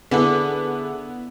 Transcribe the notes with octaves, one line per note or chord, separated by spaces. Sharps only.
D3 B3 E4 G#4 A4 B4